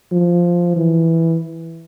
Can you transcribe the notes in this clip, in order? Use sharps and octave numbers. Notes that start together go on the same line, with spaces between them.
F3
E3